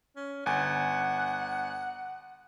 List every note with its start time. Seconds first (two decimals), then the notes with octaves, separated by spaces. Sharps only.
0.16 C#4
0.46 G1 F#5 G#5